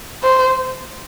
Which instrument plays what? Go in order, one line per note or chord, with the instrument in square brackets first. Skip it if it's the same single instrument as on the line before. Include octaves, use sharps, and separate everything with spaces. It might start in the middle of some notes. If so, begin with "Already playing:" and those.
[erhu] C5